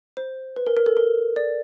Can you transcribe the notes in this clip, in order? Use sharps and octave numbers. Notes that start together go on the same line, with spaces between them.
C5
B4
A#4
A#4
A4
A#4
D5